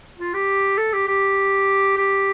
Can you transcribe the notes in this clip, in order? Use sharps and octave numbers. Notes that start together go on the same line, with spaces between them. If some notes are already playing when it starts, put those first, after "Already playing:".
F4
G4
A4
G4
G4
G4